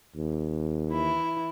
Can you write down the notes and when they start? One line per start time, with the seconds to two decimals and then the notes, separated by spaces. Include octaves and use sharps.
0.16 D#2
0.90 E3 E4